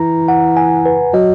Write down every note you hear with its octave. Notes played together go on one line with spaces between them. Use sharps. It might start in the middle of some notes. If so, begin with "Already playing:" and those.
Already playing: E3 A#5
F#5
G#5
B4
F#3 D#5